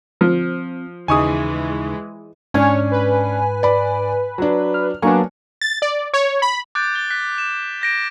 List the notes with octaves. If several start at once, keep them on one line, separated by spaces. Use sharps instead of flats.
F3 C4
D#2 C#3 E3 G#3 D#4 G#5 C#6 D#6
G#2 C#4 D4 C#5 G#5 F6
B4
D5 B5
F#3 D4
F6
F#3 A#3 B3 D4 G#5 C#6
A6
D5
C#5
B5
D6 F#6 G6 A6 D7
A6 G7
F#6 B6
E7
G6 A#6 D7